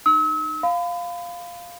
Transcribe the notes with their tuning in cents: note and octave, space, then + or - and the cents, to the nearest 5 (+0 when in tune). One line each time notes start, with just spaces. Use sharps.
D#4 -35 E6 -40
F5 +0 B5 +35